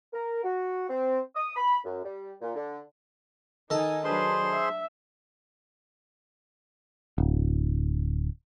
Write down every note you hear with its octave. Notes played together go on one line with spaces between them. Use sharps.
A#4
F#4
C4
D#6
B5
F#2
G3
A#2
D3
D#3 D#4 A4 G#5 A5
F#3 D4 G#4 B4 C5 C6
E5
D1